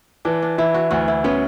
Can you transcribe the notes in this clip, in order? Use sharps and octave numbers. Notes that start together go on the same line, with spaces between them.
E3 D4
D4
E3 E4
F#4
D2 F#4
E4
B3 C#4